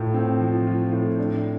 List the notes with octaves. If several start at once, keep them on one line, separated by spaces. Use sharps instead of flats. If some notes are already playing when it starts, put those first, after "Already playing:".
Already playing: A2 F4
C4
F3
F4
A2
D4